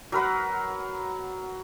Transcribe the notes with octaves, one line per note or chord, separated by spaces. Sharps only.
F#3 A#4 B4 F#5